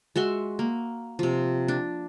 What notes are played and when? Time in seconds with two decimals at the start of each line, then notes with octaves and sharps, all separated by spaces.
0.16 G#3 F#4 E5 C6
0.59 A#3
1.19 C3 F3
1.68 D4